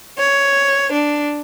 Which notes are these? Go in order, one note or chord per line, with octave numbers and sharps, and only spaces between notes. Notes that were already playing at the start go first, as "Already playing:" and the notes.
C#5
D4